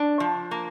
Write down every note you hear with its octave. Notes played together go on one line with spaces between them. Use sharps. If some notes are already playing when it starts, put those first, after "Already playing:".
Already playing: D4
F3
A#3